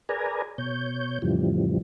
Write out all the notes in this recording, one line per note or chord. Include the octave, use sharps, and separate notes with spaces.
G#4 A#4 B4 D5 G#5 A#5
B2 C#5 G6
F2 A2 C#3 E3 F3 G3